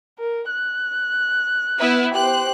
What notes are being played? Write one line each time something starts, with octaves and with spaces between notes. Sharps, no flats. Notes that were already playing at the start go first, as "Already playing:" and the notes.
A#4
F#6
B3 E4 B4
G4 C5 F#6